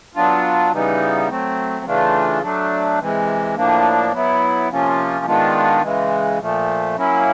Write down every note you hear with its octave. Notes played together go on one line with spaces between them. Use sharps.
F#3 B3 D4 F4
C#3 E3 G3 B3 D#4
F#3 A3 C4
C#3 E3 A3 D4 F4
F#3 A3 D4
C3 E3 G#3
A2 F3 A#3 D4
F#3 B3 E4
C3 F3 A#3 C#4 F4
D#3 G#3 B3 D4 F4
C#3 E3 G#3
A#2 F3 A3
F#3 A#3 C#4 E4